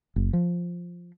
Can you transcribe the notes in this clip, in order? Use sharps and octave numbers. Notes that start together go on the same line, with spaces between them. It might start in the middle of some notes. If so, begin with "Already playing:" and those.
F#1
F3